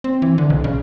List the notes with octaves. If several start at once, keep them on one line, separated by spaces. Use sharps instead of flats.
C4
E3
D3
B1
C#3